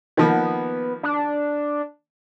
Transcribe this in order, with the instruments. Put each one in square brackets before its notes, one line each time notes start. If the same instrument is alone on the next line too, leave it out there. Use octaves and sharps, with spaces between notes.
[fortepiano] D#3 F3 A#3 [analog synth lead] B3
[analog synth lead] D4